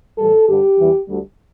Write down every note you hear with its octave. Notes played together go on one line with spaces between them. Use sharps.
A2 E3 G3 A4
G2 D3 G3 G4
E2 E3 G3
D2 D3 G3